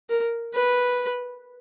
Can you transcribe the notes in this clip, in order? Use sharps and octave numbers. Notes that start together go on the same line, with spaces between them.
A#4
B4